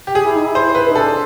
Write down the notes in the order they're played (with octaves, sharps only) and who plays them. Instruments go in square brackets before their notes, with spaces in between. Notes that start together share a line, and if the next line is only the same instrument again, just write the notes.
[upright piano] G4
G#4
[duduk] E4
D#4
E4
[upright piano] C5
B4
[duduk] D#4
[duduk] D4 [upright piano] A4